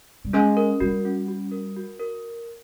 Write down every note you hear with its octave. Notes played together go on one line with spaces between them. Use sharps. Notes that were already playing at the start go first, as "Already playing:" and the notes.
G3
G#3 C#4
A#4
G3 F#4
C#4
F#4
A#4
F#4
A#4